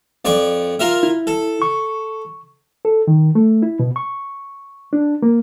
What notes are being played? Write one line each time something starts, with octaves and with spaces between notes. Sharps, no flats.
F2 D5 C#6
F4 A#4 E5
E4
A4
C#6
A4
D#3
A3
E4
B2
C#6
D4
A#3